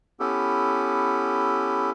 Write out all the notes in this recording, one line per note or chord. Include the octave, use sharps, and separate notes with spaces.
B3 C#4 E4 G4 A4